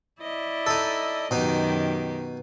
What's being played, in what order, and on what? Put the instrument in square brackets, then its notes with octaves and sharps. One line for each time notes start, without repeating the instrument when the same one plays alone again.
[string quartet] E4 D5 D#5
[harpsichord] D#4 A4
[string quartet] F#2 D#3 G4 [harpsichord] B2 D#4